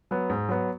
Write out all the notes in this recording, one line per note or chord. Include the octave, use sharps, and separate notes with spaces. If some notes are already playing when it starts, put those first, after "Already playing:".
F#3 B3
G#2
F#3 B3